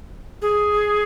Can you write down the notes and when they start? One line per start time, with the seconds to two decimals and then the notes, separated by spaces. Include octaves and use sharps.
0.42 G#4